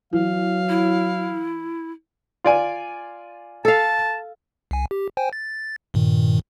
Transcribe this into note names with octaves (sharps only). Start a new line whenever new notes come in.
E3 F#3 F5
E4
F4 D5 G#5
A4 F5 A5
C2 G#5
G4
C5 G5 G#5
A6
G2 A#2 D#3